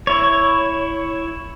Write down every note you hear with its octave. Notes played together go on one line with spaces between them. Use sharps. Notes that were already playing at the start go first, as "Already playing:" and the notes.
E4 C#5